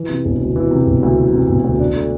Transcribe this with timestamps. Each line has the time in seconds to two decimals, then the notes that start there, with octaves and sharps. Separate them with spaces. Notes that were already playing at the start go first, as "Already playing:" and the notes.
Already playing: E3
0.09 C3
0.25 E1
0.40 D2
0.56 E3
0.71 C3
0.86 E1
1.03 D2
1.18 E3
1.33 C3
1.49 E1
1.64 D2
1.79 D4
1.96 A3